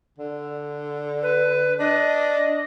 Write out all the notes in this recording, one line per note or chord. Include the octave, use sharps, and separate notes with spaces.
D3
B4
D4 D#5